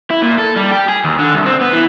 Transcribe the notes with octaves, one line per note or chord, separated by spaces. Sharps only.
E4
A#2
A4
G3
G4
G#4
D#2
D3
C2
C4
B3
E3